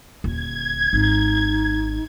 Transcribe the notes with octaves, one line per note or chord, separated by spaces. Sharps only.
D#1 D3 G#6
G#1 D#4